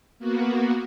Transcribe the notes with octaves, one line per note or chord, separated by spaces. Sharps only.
A#3 B3 F#4